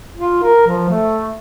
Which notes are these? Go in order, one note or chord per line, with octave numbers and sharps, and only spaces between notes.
F4
A#4
F3
A3